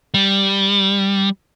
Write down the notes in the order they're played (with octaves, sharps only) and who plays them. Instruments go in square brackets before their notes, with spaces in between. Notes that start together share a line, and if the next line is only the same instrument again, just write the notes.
[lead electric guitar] G3